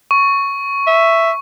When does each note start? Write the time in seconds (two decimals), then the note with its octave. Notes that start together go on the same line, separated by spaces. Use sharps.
0.11 C#6
0.87 E5